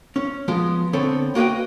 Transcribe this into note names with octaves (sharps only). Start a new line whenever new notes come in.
C#4
F3 G#3 B3
D3 B3 C4 A4 C#5
A#3 F#4 B4 D#5 G5